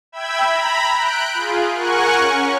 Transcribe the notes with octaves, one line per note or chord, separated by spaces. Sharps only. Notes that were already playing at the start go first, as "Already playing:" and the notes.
E5 G5 B5 E6 G#6
A#5 B5
F#6 G6 D7
F4 G#4
A#4 F#5 G#5 C#6 F#6
C#4